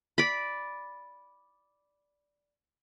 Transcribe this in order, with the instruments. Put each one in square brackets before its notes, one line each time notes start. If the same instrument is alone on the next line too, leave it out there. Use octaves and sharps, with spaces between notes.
[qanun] D5 B5